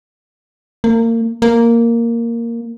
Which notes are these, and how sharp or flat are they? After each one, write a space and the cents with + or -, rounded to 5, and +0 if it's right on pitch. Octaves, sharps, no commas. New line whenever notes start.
A#3 -30
A#3 -5